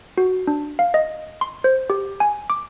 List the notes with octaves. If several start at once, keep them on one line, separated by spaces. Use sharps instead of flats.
F#4
D4
F5
D#5
C6
C5
G4
G#5
D6